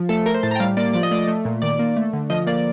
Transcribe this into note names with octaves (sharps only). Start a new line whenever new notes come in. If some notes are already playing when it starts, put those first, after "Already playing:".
Already playing: F3
A3 A4
A3 A#4
C5
A2 A5
A#5
G5
G3 F5
A#3 D5
F3 D5
D#5
A3 D5
A3
A#2
D#3 D5
A#3
A3
D3
F3 D#5
A#3 D5